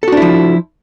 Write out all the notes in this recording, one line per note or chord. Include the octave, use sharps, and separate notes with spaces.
F3 D4 E4 F#4 A4